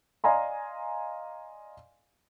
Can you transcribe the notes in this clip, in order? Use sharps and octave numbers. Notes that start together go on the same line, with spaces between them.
D5 D#5 F5 G#5 A#5 C6